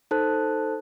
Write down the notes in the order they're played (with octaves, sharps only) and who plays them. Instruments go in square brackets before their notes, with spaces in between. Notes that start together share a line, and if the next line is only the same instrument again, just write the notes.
[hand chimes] D#4 A4 C5 A5 F#6